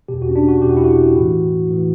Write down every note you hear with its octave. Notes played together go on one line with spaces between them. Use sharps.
E2 B2 G4
F#4
C#4
D4
F#4
E2 B2 G4
F#4
E4
F#4
A2 E3
A2 E3